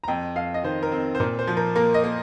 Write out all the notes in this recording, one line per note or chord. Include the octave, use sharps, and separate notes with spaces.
A#5
F2 G5
F2 F5
D#5
D#3 C5
A#4
C4
C5
A#2 A#4
C5
F3
A#4
A#3 A#4
D#5
A#3